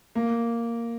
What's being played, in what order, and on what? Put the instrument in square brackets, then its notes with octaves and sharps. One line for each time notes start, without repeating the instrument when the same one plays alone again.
[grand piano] A#3